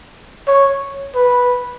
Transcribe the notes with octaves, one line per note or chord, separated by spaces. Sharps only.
C#5
B4